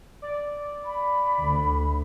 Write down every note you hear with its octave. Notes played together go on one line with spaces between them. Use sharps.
D5
B5
D2